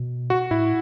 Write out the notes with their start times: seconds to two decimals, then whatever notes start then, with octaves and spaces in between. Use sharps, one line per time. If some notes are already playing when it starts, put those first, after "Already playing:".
Already playing: B2
0.30 F#4
0.51 A2 E4